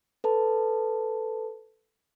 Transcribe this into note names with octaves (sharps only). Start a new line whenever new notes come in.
A4 B4 A5